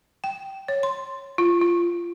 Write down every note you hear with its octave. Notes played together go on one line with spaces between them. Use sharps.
G5
C#5
C6
F4
F4